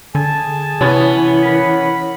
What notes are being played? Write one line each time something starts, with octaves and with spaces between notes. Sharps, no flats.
D3 G#4 G#5 A5
C3 E3 B3 C#4
A#4 F#5 B5